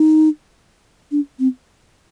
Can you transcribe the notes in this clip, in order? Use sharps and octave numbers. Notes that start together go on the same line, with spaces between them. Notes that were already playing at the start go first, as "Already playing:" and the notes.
Already playing: D#4
D4
C4